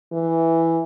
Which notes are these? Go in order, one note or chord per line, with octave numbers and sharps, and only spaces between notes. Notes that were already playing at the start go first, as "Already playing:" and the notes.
E3